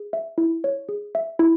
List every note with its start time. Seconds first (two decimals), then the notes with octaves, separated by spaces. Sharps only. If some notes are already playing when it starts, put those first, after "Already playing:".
Already playing: G#4
0.13 E5
0.38 E4
0.64 C#5
0.89 G#4
1.15 E5
1.39 E4